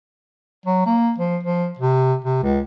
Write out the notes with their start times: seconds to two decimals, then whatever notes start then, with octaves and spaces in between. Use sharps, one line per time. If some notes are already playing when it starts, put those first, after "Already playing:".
0.66 F#3
0.86 A#3
1.19 F3
1.44 F3
1.79 C3
2.24 C3
2.43 C#2